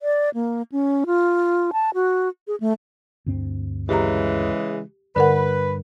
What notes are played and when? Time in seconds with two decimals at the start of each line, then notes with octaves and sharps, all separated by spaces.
0.01 D5
0.34 A#3
0.72 C#4
1.06 F4
1.73 A5
1.94 F#4
2.47 G#4
2.60 A3
3.26 D2 G2 C4
3.89 C#3 E3 G#3 G4 A#5
5.16 G2 D3 A#4 B4 F#5